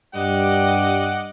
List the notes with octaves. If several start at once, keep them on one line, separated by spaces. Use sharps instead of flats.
G2 G3 D#5 F#5 D6